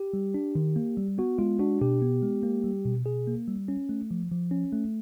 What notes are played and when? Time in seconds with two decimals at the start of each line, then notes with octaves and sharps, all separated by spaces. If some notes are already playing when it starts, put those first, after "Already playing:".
Already playing: G4
0.13 G3
0.34 D4
0.55 D#3
0.76 A#3
0.97 G3
1.18 B3 F#4
1.39 G#3 F4
1.59 D4 F#4
1.81 B2 G4
2.02 B3
2.23 G#3
2.43 A#3
2.64 G3
2.85 B2
3.06 B2 G#4
3.27 A#3
3.48 G3
3.68 C#4
3.89 A3
4.11 F3
4.31 F3
4.51 C#4
4.73 A3